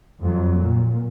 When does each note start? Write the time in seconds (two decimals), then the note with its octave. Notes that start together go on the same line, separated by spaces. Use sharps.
0.20 F2 F#3
0.58 A#2